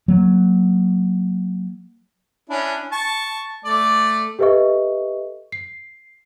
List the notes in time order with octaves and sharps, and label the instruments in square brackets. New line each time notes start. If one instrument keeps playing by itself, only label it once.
[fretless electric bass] F#3 A#3
[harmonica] C#4 D4 E4
A5 C#6
A3 D5
[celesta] G4 A4 B4 D#5 E5 C#6
C7